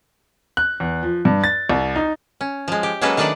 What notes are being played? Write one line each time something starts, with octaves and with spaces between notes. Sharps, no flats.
F#6
E2
F3
G2
A6
C2
D#4
C#4
F3 G#3
G4
F#3 G#3 A#3 C#4 A4 B4
D#3 A3 D4 B4 D5 F#5